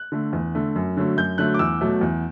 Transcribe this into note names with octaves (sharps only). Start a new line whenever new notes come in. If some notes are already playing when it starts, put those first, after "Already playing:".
Already playing: F#6
D3 A3
E2
D3 A3
F#2
D3 F#3 A3
F#2 G6
D3 F#3 A3 F#6
D6
E2 E6
B2 F#3 A3
E2